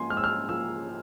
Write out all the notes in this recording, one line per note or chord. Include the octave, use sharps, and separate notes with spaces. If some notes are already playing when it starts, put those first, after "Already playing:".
Already playing: G#2 F3 A#3 G#5 C6
G#2 F6
E6
F6
F3 A#3 E6